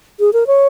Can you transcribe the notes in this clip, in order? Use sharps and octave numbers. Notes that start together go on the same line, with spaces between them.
G#4
A#4
C#5